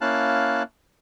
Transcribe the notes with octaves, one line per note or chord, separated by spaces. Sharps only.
A#3 C#4 E4 F5 A5 F#6